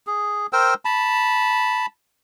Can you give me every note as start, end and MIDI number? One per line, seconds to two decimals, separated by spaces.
0.07 0.47 68
0.53 0.74 70
0.53 0.74 72
0.53 0.74 79
0.53 0.74 88
0.85 1.86 81
0.85 1.86 83